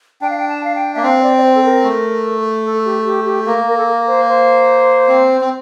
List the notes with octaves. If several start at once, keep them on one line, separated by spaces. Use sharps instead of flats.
D4 G5
F5
G5
A5
F5
G5
A#3 E5
C4 F5
C5
D5
D5
C5
A4
A#4
A3
A4
G4
G4
G4
A#3 A#4
A#4
A4
A#4
C5
C5
C4
C4